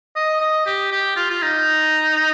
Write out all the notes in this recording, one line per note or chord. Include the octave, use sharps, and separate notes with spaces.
D#5
D#5
G4
G4
F4
F4
D#4